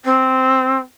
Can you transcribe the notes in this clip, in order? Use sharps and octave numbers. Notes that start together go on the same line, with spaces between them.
C4